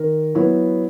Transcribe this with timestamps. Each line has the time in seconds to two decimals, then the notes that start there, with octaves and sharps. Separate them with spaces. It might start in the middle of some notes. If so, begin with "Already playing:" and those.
Already playing: D#3 A#4
0.35 F#3 B3 E4